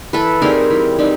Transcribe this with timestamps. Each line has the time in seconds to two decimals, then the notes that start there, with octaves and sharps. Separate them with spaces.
0.13 E3 A4 B4
0.42 G3 C4 D#4 G#4 A#4
0.70 E3
0.99 G3 C4 D#4